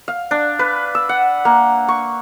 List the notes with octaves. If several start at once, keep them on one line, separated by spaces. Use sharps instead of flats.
F5
D4
B4
E6
F#5
A#3
C#6